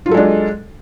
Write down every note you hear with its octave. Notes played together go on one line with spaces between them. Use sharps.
F#3 G#3 D4 F4 A4